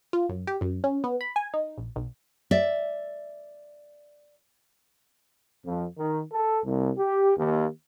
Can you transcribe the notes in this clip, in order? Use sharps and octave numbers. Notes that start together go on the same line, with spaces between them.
F4
F#2
G4
F#2
C#4
B3
B5
G#5
D#4
A#1
B1
D5 E5
F2
D#3
A4
C2
G4
D#2